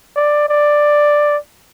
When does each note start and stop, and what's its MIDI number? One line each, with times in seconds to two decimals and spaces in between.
0.16 0.47 74
0.49 1.37 74